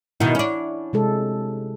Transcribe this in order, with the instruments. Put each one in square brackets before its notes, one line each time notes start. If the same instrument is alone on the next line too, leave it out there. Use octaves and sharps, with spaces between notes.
[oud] B2 D#3 [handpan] E4 F#5
[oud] C#4 D4
[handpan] C3 G#3 A4